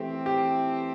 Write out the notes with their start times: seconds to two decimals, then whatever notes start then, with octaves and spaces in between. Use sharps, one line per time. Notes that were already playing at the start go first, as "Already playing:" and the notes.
Already playing: E3 A3 C4 G4
0.26 G4